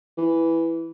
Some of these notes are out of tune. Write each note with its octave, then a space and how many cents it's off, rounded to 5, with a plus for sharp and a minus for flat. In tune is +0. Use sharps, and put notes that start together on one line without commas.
E3 +0